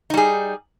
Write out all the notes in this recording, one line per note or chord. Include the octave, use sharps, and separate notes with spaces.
G3 D#4 G#4